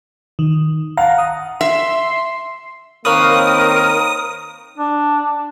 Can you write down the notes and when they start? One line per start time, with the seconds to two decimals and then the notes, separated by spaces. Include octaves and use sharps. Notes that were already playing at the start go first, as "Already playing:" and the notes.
0.39 D#3
0.97 F5 F#5 A5 A#5
1.18 D#6
1.61 E5 C6
3.05 D#3 A#3 C4 A#4 B4 C#5 F5 D#6
4.78 D4